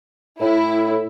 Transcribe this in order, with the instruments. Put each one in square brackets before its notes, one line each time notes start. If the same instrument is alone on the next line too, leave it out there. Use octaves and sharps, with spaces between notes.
[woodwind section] A2 [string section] E4